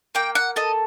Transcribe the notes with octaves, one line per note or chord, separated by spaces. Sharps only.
A#3 G5
F#5
A4 D#5